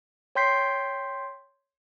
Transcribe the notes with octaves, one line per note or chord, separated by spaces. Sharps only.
C#5 G5 C6 G6 B6 C7